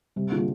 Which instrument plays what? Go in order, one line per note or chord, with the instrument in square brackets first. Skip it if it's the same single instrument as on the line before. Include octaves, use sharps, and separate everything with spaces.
[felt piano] C3 [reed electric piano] G3
[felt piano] D3 [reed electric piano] A#3 F4 G#4